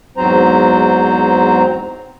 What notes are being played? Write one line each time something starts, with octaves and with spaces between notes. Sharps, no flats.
E2 G#2 F#3 C4 C5 A#5